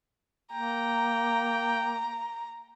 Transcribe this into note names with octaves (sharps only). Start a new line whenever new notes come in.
A#3 G5 A#5